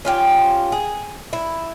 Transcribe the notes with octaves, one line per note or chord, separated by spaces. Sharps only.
C#4 F4 G4
G#4
E4